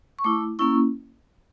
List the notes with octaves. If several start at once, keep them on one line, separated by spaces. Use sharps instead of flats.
C#6
A3 E4 D6
A#3 C#4 E4 C#6